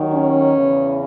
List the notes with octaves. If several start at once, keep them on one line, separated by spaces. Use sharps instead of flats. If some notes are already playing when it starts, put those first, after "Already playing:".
Already playing: D#2 D#3 F#3
C#4
E2 C#3 E3